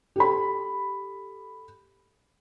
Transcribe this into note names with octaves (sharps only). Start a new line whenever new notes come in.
G4 A4 B5